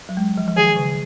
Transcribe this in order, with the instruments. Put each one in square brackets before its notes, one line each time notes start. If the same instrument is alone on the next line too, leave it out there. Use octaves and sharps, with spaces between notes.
[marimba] F#3
G#3
F3
F3
[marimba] D#3 [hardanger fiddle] G#4
[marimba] C#3